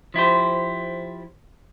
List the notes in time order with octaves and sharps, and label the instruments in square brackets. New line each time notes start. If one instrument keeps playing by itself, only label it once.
[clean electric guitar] F3 E4 G4 C5